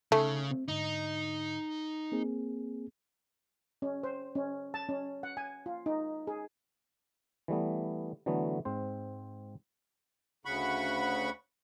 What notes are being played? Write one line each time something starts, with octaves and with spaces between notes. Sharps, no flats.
C#3 A3 D#4
C4
G#2 D3 D#4
A#3 C4 G#4
C#4
C5
C#4
A5
C#4
F#5
G#5
F4
D#4
G#4
E3 G3 A3 B3
D3 E3 F#3 A3 B3
G#2 C4 C5
D2 C#3 F#5 B5 C#6